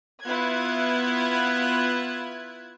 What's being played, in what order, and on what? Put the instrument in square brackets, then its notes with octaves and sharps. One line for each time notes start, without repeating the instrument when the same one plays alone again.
[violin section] B3 E4 F4 F#6 G#6